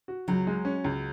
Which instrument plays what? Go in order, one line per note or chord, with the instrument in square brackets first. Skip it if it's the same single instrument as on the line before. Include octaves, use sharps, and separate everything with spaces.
[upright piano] F#4
[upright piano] C#2 [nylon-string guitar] F#3
[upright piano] G#3
C#4
C#2